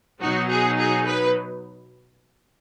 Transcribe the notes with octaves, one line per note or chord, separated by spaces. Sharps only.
B2 F#3 D#4 F#4
G#4
G#4
B4